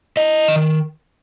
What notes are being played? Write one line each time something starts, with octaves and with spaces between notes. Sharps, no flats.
E4 D#5
D#3